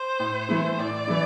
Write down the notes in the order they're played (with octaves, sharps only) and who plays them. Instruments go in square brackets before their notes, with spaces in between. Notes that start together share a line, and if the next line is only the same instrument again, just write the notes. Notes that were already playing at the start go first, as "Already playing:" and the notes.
Already playing: [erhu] C5
[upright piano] A2
E3 A3 E4
[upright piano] A2 [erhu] D5
[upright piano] E3 A3 E4